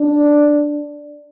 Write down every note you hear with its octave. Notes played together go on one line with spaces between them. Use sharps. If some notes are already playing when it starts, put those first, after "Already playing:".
Already playing: D4